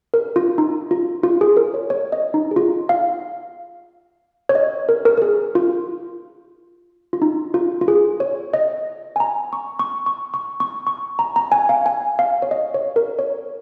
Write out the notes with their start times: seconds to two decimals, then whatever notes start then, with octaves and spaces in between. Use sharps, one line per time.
0.14 A#4
0.36 F4
0.58 D#4
0.91 F4
1.23 F4
1.41 G#4
1.57 A#4
1.74 C#5
1.90 C#5
2.12 D#5
2.34 D#4
2.51 G#4
2.56 F4
2.89 F5
4.49 C#5
4.55 D#5
4.89 A#4
5.05 A#4
5.17 A#4
5.22 G#4
5.55 F4
7.13 F4
7.22 D#4
7.54 F4
7.81 F4
7.88 G#4
8.20 C#5
8.54 D#5
9.16 G#5
9.20 A#5
9.53 C#6
9.79 C#6
10.06 C#6
10.34 C#6
10.60 C#6
10.87 C#6
11.19 A#5
11.36 A#5
11.52 G#5
11.69 F5
11.86 G#5
12.19 F5
12.42 C#5
12.51 D#5
12.74 C#5
12.96 A#4
13.19 C#5